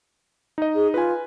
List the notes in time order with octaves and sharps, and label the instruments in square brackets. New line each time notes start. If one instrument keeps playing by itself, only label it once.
[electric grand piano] D#4 D#5
[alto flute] G#4
[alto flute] F4 [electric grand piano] B4 G#5